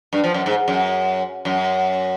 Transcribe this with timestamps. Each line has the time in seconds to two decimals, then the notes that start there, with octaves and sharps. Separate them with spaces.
0.13 G2
0.24 F3
0.34 F#2
0.46 G#2
0.68 F#2
1.45 F#2